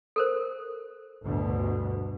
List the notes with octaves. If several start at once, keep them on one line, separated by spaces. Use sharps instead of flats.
A4 A#4 C5
G1 D2 B2